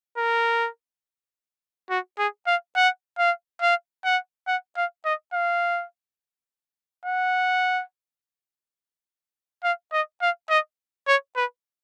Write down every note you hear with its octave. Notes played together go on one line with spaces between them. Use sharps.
A#4
F#4
G#4
F5
F#5
F5
F5
F#5
F#5
F5
D#5
F5
F#5
F5
D#5
F5
D#5
C#5
B4